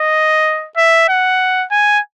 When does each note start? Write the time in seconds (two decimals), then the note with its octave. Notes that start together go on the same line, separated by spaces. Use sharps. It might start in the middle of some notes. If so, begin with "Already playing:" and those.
Already playing: D#5
0.77 E5
1.09 F#5
1.71 G#5